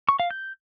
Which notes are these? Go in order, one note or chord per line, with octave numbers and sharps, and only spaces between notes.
C#6
F5
G6